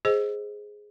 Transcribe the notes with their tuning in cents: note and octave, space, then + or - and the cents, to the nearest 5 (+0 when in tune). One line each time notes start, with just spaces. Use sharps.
G#4 +0 C5 +0 D#5 +0